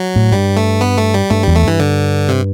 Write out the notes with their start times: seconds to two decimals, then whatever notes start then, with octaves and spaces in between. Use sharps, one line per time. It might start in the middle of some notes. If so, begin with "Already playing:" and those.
Already playing: F#3
0.16 A2
0.32 G2 G3
0.57 A3
0.81 B3
0.98 A3
1.14 G3
1.30 G2 A3
1.43 E2 G3
1.56 A3
1.63 G2 E3
1.80 D3
2.29 C3